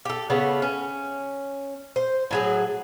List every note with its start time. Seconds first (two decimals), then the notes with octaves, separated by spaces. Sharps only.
0.05 G4 A4
0.30 C#3 A3 B3
0.62 C#4
1.96 C5
2.31 A2 F#3 G#4